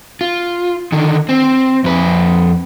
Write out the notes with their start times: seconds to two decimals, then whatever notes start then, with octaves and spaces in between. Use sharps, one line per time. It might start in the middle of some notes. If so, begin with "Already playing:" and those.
0.21 F4
0.92 D3 D#3
1.29 C4
1.84 F2 B4